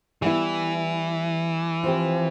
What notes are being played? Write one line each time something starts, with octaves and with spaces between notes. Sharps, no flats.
E3 G3 B3 E4
F3 C4 G4